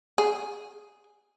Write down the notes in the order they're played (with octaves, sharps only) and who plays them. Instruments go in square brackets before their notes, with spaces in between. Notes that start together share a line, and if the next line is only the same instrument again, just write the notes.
[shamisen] G#4